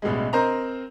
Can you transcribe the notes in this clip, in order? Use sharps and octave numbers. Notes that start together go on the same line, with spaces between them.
A1 B2 G3 G#3
C4 A#4 C5 D#5 A#5